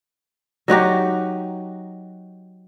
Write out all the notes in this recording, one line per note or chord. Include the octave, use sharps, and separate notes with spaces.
F#3 D#4 F#4 G4